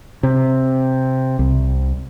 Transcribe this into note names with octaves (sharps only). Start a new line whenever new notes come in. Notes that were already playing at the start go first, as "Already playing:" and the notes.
C3
C2